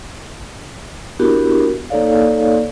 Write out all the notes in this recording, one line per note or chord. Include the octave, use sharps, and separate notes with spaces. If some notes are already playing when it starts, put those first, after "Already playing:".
B3 D4 E4 F#4 G4 A#4
A#3 D#4 A4 C#5 D5 F5